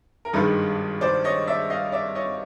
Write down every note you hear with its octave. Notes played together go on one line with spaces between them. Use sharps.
A#4
G#1 G2 D#3 G#3 A4 B4
C5 D5
C#5 D#5
D5 E5
D#5 F5
D5 E5
C#5 D#5